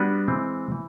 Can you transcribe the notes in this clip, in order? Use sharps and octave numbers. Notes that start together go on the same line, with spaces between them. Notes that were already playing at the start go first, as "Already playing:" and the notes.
Already playing: G3 B3 D4 F#4 B4
E3 G#3 C4
E3